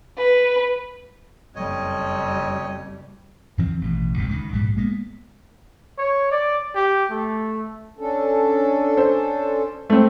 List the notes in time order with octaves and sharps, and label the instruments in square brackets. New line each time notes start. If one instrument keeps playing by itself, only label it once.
[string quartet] B4
[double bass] F#1 G3 [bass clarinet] F2 [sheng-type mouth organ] C#5 D#5
[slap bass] E2 D#3 F3 C4
A1 B2
D#1 C2 F#2 A2
C#2 D#3
A#1 G#2 B2 G3
G#3 A#3 B3
[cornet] C#5
D5
G4
A3
[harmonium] C#4 D4 A4
[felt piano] C5
A3 C4